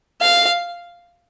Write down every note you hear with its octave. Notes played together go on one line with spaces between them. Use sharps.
F5